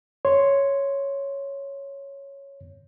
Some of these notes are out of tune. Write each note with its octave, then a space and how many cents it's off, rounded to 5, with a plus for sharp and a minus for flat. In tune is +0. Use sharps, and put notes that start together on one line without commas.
C#5 +0 C6 +0